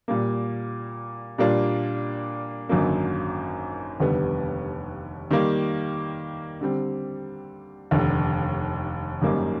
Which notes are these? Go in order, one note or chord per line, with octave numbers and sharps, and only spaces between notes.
A#2 G3 A#3
A#2 G3 A#3 D4 F4
G#1 F#2 D3 F#3 A#3
F1 D#2 D3 G3 B3
D#3 G3 A#3
D3 G3 C4
F1 D#2 D3
G#1 F#2 D#3 G3 A#3